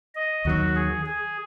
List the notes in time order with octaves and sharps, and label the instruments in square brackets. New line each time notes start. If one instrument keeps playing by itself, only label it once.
[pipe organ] D#5
[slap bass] D#2 D#3 F#3 [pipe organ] F#4
[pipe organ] G#4
G#4